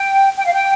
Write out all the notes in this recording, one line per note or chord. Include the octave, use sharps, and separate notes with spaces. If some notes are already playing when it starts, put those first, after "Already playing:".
Already playing: G5
G5
F5
G5